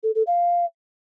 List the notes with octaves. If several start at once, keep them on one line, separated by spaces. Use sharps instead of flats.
A4
A4
F5